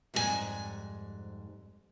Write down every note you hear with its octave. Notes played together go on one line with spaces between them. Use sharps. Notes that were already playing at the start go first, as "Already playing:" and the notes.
F2 G#2 G3 F#4 G#5